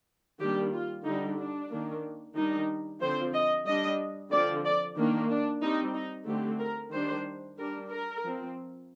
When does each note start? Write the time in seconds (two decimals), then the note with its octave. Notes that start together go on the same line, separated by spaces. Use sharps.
0.40 D#3 G3 A#3 D4 G4
0.73 F4
1.05 D3 G3 D4 D#4
1.39 D4
1.71 D#3 A#3 D4
2.36 D#3 G3 D4 D#4
3.01 D3 F3 C4 C5
3.33 D#5
3.66 G3 D4 D#5
4.31 D3 F3 C4 D5
4.65 D5
4.96 D#3 A#3 D4
5.29 D4
5.62 G3 C4 D#4
5.95 D#4
6.27 D3 A3 C4 G4
6.60 A#4
6.92 D#3 G3 D4 C5
7.58 G3 D4 A#4
7.90 A#4
8.23 F3 C4